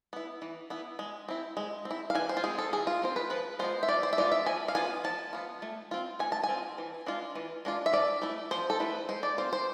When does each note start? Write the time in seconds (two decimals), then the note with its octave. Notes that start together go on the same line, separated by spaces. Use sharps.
0.13 B3 E4
0.42 E3
0.70 B3 E4
0.99 G#3
1.28 C4 E4
1.57 G#3
1.85 C4
1.91 E4
2.10 F5
2.15 E3 G#5
2.29 C5
2.37 F4
2.44 G#3 C4 G#4
2.58 A4
2.73 E3 G#4
2.87 F4
3.02 G#3 C4 C5
3.16 B4
3.30 F3 B4
3.59 G#3 B3 F4 C5
3.83 E5
3.88 F3 D5
4.03 C5
4.13 E5
4.17 G#3 B3 F4 D5
4.32 E5
4.46 F3 G#5
4.68 F5
4.75 B3 F4 G#5
5.04 F3 A5
5.33 B3 F4
5.62 A3
5.91 C4 F4
6.19 A3 G#5
6.32 A5
6.43 G#5
6.49 C4 F4
6.78 E3
7.06 G#3 D4 F4
7.35 E3
7.65 G#3 D4 F4
7.86 E5
7.93 F3 D5
8.22 A3 E4
8.51 F3 C5
8.70 A4
8.80 A3 E4 B4
9.09 G#3 C5
9.23 D5
9.38 C4 F4 C5
9.53 C5